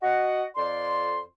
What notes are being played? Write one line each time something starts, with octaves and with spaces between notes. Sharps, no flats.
F#4 D#5 F#5
F2 D5 C6